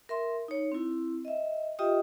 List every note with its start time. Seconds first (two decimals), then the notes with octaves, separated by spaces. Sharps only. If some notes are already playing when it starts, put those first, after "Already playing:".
0.09 A#4 E5 C6
0.48 D#4 C#5
0.72 C4 E4
1.25 D#5 E5
1.79 F4 G4 D#5 E5 G5 D#6